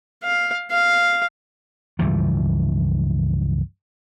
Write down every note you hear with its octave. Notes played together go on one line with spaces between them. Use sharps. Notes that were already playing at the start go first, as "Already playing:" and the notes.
F5
F5
C#2 G2 E3 F3